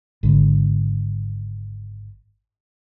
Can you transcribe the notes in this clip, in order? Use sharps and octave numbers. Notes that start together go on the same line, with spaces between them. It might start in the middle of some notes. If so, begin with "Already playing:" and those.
G#1 D3